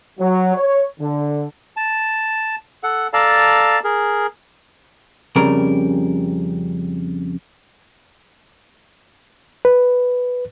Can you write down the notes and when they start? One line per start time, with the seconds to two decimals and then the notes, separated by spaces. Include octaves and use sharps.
0.19 F#3
0.55 C#5
0.99 D3
1.77 A5
2.83 A4 F#5
3.13 A4 D5 F5 A5 A#5
3.84 G#4 A#4
5.36 F2 C#3 G3 A#4
9.65 B4